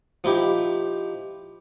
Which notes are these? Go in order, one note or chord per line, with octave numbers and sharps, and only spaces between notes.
F3 D#4 E4 G4